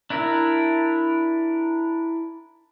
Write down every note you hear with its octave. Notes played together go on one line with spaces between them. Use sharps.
D4 E4 A#4 E5